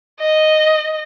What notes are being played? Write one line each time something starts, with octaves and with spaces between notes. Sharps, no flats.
D#5